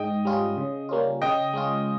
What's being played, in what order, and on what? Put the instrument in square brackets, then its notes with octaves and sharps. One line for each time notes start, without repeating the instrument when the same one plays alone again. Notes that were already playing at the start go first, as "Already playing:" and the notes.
Already playing: [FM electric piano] G#2 [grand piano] D#5 G5
[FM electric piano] G3 C#4 F4
C#3
G3 A#3 C#4 F4
[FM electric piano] C#3 [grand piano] D#5 G5
[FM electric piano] G#3 C#4 F4